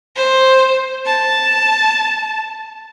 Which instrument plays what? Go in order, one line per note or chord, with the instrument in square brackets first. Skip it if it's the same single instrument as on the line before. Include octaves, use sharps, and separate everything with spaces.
[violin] C5
A5